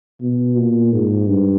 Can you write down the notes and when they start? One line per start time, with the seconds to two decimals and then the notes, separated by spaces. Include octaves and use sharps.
0.21 B2
0.57 A#2
0.92 G#2
1.27 G2